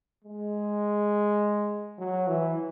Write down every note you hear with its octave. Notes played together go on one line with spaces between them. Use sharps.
G#3
F#3
E3